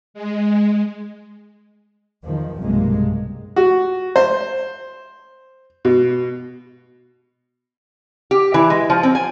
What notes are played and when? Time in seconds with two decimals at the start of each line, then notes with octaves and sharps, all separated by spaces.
0.14 G#3
2.25 E2 D#3 F3
2.60 B1 G2 C3 G#3 A#3
3.56 F#4
4.16 C5
5.85 B2
8.31 G4
8.54 E3
8.70 G#3
8.90 F3
9.03 C4
9.15 G#5